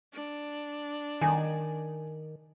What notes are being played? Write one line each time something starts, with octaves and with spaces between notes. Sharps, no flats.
D4
D#3 G#5